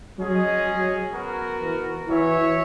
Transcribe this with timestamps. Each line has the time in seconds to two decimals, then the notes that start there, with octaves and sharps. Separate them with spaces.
0.18 F#3 G#3 C#4 G#4 D#5
0.66 F#3
1.13 B3 F#4 A#4
1.61 E3
2.07 E3 F#4 C#5 E5